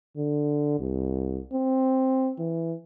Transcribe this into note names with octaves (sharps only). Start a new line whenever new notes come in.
D3
C2
C4
E3